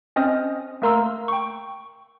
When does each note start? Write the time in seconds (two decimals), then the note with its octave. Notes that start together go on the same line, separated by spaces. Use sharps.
0.16 C4 C#4 C5 D#5 D#6 F6
0.82 A3 A#3 A#4 A#5 C6 E6
1.28 G5 C#6